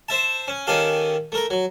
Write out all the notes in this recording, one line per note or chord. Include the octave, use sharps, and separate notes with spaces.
C5 E5 A5
C#4
D#3 C#4 G4 A4 F5
A3 A#4
F#3